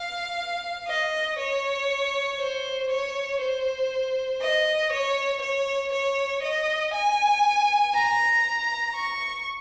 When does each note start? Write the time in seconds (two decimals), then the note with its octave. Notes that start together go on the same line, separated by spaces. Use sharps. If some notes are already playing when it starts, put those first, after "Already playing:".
Already playing: F5
0.88 D#5
1.39 C#5
2.40 C5
2.90 C#5
3.41 C5
4.41 D#5
4.93 C#5
5.42 C#5
5.93 C#5
6.43 D#5
6.94 G#5
7.95 A#5
8.95 C#6